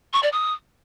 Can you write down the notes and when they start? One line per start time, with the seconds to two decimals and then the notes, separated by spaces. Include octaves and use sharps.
0.13 C#6
0.23 D5
0.32 D#6